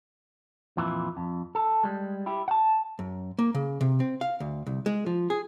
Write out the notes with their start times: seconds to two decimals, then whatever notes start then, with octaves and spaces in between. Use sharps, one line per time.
0.77 F2 A#2 E3 E4
1.17 F2
1.55 A4
1.84 G3 G#3
2.26 E4 G4
2.48 F#5 A5
2.99 F#2
3.39 A#3
3.55 C#3
3.81 C3
4.00 C4
4.21 F5
4.40 D2
4.67 C2
4.86 G#3
5.06 F3
5.30 G#4